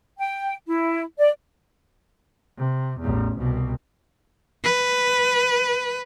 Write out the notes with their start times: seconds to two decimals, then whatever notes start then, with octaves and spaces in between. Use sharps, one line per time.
0.19 G5
0.67 E4
1.19 D5
2.58 C3
3.00 A1 E2
3.38 C2 B2
4.64 B4